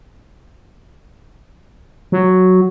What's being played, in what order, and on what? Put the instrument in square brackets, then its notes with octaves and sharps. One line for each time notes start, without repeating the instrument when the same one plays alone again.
[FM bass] F#3